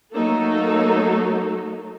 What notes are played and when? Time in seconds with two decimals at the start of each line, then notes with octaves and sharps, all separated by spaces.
0.12 F#3 A3 A#3 D#4 A4